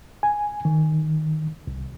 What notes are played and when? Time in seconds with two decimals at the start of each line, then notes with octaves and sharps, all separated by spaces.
0.23 G#5
0.65 D#3
1.67 C2